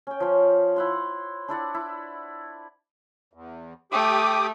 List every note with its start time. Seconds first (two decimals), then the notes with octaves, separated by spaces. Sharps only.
0.07 C#4 G5
0.20 F3 C#4
0.76 E4 F#5 C6
1.48 D4 E4 D5 F#5
1.74 E4
3.33 E2
3.92 A3 G4 D6 D#6